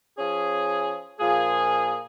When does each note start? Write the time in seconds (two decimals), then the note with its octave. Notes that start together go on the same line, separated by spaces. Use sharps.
0.17 F3 C#4 G#4
1.18 A#2 F3 A#3 F4 G#4